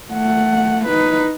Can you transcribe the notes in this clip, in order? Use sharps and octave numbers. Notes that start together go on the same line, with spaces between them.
A3 F#5
D#4 B4